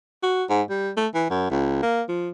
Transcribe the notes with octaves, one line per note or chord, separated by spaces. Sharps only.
F#4
G#2
G3
A3
E3
F#2
C#2
A#3
F3